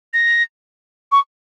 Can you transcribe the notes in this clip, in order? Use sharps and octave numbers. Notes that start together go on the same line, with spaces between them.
A#6
C#6